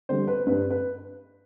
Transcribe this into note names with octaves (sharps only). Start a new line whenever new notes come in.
D3 G3 C5
B4
G2 B4
B4